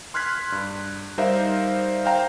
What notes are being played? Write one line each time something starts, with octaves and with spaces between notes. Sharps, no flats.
C6 F6 F#6 G#6 B6
G2
G3 D#4 A#4 C5 E5 F5
C5 F5 G5 A#5